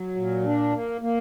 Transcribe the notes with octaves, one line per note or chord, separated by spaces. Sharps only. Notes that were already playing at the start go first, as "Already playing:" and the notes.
Already playing: F#3
A#2
D4
A#3
A#3